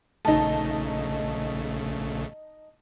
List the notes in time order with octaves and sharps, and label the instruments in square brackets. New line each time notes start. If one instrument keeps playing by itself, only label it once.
[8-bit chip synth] A#1 C#3 A3 [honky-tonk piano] D#4 A5